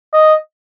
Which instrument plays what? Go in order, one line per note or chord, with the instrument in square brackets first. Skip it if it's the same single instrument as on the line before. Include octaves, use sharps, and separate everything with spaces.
[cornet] D#5